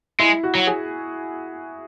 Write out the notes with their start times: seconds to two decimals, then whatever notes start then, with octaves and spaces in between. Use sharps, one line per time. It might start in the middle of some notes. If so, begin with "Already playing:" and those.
0.19 G#3 E4
0.44 F#4
0.55 F#3
0.67 G#4